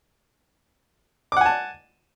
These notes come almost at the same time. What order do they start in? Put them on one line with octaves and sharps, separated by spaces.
D6 F#5 G#5 A5